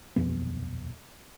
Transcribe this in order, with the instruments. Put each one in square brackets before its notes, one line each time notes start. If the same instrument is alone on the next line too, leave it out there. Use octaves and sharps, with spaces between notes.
[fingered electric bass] D#1 B1 F2 B3